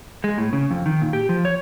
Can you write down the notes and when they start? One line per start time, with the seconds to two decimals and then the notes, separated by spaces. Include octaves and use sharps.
0.24 G#3
0.38 A2
0.53 C#3
0.71 F2
0.86 D#3
1.01 A#2
1.13 G4
1.29 F3
1.45 C#5